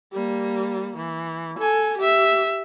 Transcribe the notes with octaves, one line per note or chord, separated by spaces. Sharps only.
G3 A#3
E3
A4 G#5
G4 E5